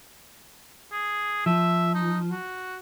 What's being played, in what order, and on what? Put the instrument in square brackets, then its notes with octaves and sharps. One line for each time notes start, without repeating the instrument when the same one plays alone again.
[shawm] G#4
[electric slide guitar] F3 [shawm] E5
[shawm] D#4
F#4